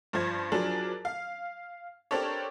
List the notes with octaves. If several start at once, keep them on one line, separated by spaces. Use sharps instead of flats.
G2 F3 C5 G#6
F3 F#3 D4 G#4 A#4
F5
C4 D4 G4 A4 A#4 C#5